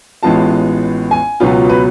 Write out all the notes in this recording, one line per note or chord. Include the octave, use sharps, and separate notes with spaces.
A1 A2 G#3 B3 F4 A5
G#5
C#2 B2 F#3 B3 F4
B4